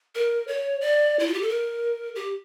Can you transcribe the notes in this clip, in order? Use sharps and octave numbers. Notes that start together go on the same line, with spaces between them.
A#4
C#5
D5
E4
F4
G4
A4
A#4
G4